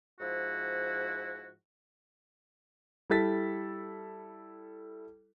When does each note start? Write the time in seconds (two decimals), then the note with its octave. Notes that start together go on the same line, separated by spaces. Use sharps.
0.20 G#2 F3 E4 F#4
3.10 G3 E4 A4 A6 B6